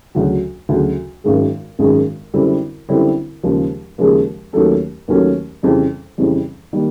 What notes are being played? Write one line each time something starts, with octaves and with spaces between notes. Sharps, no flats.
D2 C#3 F#3
D2 C#3 F#3
G#1 F#2 D#3 G#3
G#1 F#2 D#3 G#3
F#2 D3 G3 C4 E4
F#2 D3 G3 C4 E4
D#2 C#3 F3 G#3
D#2 C#3 F3 G#3
D#2 D#3 F#3 A3 C#4
D#2 D#3 F#3 A3 C#4
F2 C#3 E3 G3
F2 C#3 E3 G3
D#3 G3 A#3